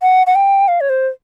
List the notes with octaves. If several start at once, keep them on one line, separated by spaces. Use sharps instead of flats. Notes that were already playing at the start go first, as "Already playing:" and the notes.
F#5
F#5
G5
F5
C#5
C5